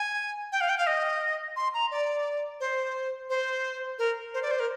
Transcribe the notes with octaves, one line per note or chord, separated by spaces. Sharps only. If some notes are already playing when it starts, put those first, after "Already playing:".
Already playing: G#5
G5
F5
G5
F5
D#5
C6
A#5
D5
C5
C5
A#4
C5
D5
C5
A#4